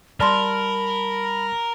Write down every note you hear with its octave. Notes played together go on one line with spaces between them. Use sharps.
G3 A#4 D5 A5 B5 C6 F6